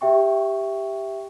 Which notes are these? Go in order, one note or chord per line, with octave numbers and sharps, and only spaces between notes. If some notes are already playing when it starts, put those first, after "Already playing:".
G4 E5 G5 C#6